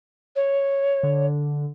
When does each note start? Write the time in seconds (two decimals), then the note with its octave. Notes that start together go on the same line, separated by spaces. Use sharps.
0.36 C#5
1.03 D3